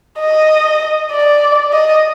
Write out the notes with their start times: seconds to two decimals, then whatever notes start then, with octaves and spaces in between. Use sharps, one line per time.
0.19 D#5
1.12 D5
1.73 D#5